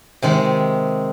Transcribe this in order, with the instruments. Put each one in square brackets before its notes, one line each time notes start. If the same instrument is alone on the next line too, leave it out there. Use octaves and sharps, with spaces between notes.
[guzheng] C3 D#3 G#3